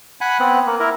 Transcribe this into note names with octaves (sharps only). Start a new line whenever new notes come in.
F#5 G#5 B5 F#6
B3 C4
A#3
E4 A#4